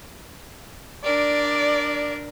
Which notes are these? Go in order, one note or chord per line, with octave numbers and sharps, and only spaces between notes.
D4 A#4 D5